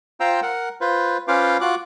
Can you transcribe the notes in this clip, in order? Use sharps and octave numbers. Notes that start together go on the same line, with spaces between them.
F4 C5 F5 G5 A#5 E6
A#4 F#5
F4 B4 C5
C#4 F4 B4 C5 F5 D6
F4 F#4 D6 F#6